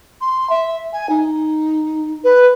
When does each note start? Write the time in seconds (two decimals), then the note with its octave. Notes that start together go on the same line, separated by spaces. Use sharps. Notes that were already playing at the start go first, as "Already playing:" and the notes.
0.21 C6
0.50 E5
0.93 G#5
1.09 D#4
2.24 B4